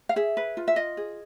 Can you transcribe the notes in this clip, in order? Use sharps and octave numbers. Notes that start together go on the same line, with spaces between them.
F5
G#4 E5
B4
F4
E5
F4 D#5
G#4